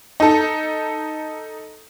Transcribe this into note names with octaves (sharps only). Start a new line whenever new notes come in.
D#4 A4